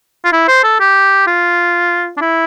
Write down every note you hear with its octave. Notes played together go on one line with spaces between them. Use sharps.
F4
E4
C5
A4
G4
F4
D4
E4